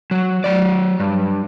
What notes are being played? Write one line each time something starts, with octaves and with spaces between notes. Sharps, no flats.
F#3
F#3 D5
G2